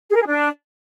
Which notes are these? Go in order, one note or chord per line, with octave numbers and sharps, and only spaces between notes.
G#4
A#4
G#4
D4